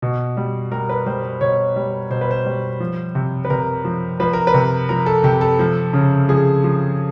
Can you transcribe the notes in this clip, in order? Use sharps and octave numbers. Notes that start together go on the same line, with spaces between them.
B2
G3
G3 A#4
B4
G3 C5
C5
B2 C#5
G3
B2 C5
B4
C5
G3
F3
C3
B4
C3 A#4
F3
F3 B4
A#4
B4
C3
F3 A#4
A4
C3 G4
A4
F3
C#3
F3 G#4
F3